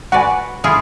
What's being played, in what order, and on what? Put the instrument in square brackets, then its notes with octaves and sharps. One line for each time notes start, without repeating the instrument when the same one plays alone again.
[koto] F#4 B4 D5 [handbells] F#5 G#5
[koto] E4 F4 G#4